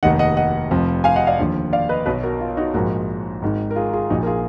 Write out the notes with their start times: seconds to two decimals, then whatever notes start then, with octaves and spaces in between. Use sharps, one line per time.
0.03 F1 D#2 D#3 D#5 F#5
0.19 D#5 F#5
0.37 D#5 F#5
0.71 F1 F2 F3
1.04 F5 G#5
1.16 D#5 F#5
1.27 D5 F5
1.39 D#2 D3 F3
1.73 D5 F5
1.89 B4 D#5
2.06 B1 B2 B4 D#5
2.23 F#4 A#4
2.41 F4
2.57 D#4 F#4
2.74 A#1 G#2 F3 F#4 A#4
3.42 G#1 G#2 D#3
3.71 A#4
3.76 F4 G#4
3.93 F4 G#4
4.10 A#1 A#2 F3 D#4 F#4
4.23 A#4
4.26 F4 G#4